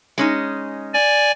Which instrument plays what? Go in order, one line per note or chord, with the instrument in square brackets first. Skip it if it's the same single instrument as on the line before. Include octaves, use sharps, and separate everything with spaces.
[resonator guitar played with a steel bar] G#3 C#4 D#4
[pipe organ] D5 G#5